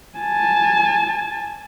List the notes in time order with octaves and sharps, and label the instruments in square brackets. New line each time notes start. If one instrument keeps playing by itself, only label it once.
[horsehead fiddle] G#5 A5